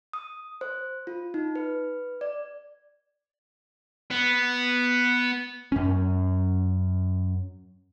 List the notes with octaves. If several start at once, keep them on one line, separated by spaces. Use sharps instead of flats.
D#6
C5
F4
D#4
B4
D5
B3
F#2 C#4